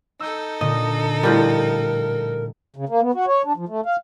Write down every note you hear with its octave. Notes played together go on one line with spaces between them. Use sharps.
D#4 A4 E6 G6 C#7
A#2 D3 D#5
A2 F3 G3 A#4
C#3
A#3
B3
F#4
C#5
D4
F3
A3
F5